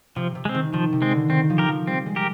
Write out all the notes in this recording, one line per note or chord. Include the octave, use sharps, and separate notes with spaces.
C3 F3
C3
G#3 C4
D#3
D#3 F3
C3
G#3 C4
D3
D#3 C4
F3
G4 A#4
F3
G3 C4
G#3
G4 A#4